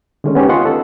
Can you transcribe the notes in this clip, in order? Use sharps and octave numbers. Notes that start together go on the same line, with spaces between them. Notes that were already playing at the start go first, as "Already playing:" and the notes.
D3 D#3 G#3 A3 C#4
B3 C#4 D#4 G4
F4 B4 D#5 F#5 C6 C#6
A4